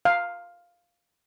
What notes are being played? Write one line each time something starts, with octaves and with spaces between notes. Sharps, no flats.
F5